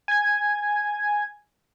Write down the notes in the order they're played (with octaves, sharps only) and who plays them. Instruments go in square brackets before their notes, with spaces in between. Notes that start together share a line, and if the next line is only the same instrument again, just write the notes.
[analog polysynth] G#5 G#6